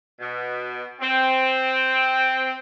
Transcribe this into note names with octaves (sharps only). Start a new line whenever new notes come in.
B2
C4